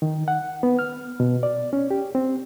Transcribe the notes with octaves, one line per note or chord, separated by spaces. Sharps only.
D#3
F#5
B3
F6
B2
D5
C#4
G4
C4